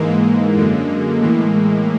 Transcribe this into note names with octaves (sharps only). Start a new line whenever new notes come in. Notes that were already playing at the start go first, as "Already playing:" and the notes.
Already playing: G#2 E3 G#3 A#3
F#2 D3
A2 E3